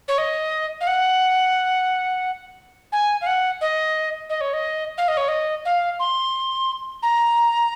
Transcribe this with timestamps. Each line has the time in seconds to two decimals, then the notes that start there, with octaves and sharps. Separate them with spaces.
0.08 C#5
0.18 D#5
0.81 F5
0.87 F#5
2.92 G#5
3.21 F5
3.27 F#5
3.61 D#5
4.30 D#5
4.41 C#5
4.53 D#5
4.98 F5
5.08 D#5
5.17 C#5
5.28 D#5
5.65 F5
6.00 C6
7.03 A#5